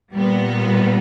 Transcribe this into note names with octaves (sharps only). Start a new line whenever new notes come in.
A#2 G3 B3